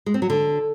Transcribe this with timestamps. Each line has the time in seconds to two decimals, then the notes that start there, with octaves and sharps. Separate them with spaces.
0.06 G#3
0.14 C4
0.22 F#3
0.30 D3